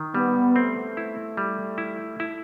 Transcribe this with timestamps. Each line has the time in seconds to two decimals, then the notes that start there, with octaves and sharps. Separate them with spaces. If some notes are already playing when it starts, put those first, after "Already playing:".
Already playing: D#3
0.14 G3 B3
0.56 A3 C4
0.97 E4
1.37 G3
1.78 E4
2.20 E4